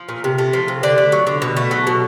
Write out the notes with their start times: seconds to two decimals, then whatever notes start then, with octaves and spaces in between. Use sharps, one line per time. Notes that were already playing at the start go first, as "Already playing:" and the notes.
Already playing: F3
0.09 A#2
0.24 C3
0.38 A3
0.53 F3
0.68 C3
0.83 D3 D5
0.98 A3
1.12 F#3
1.27 D3
1.42 B2
1.57 A3
1.71 F#3
1.87 B2